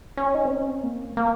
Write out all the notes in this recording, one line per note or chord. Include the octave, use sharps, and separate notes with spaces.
C#4
D#4
C4
C#4
C4
A#3
A#3